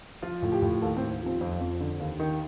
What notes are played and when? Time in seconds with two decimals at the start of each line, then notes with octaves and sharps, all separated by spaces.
0.22 F3 F4
0.42 A2
0.52 G4
0.62 A2
0.82 D#2 A4
0.97 C4
1.01 D#2
1.21 F3
1.26 C4
1.41 F2
1.61 F2
1.80 D3
2.00 D#2
2.20 D#3